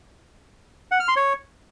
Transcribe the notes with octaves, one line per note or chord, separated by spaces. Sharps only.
F#5
F6
C6
C#5